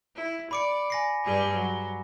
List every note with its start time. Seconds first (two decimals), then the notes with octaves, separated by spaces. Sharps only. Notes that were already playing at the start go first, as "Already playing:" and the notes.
0.15 E4
0.51 D5 B5 D6 C#7
0.90 G#5 A#6 C7
1.24 G2 G3 G#4
1.54 F#3